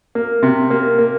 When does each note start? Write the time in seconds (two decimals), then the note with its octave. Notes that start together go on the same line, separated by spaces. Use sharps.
0.15 A#3
0.43 C3
0.70 A#3
0.98 A#3